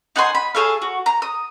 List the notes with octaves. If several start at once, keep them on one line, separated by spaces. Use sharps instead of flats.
D#4 F#5 G#5 C6
B5
G#4 A4 C#5 F5
F#4
A#5
D#6